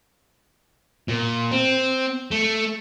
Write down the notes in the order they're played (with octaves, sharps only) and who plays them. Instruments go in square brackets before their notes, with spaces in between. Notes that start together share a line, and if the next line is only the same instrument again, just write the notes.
[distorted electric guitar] A#2
C4
A3